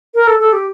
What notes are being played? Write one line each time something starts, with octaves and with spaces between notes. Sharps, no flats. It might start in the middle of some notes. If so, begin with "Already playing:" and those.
A#4
A4
A4
G4